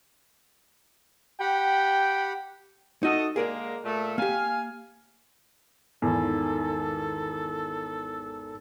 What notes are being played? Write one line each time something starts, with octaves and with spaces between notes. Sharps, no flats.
G4 F#5 G5 B5
A3 D#4 F#4 A4 D#5
D3 G#3 A#3 G#4 A#4 D5
A#2 A3
A#3 G4 F5 G#5
G#1 E2 E4 A4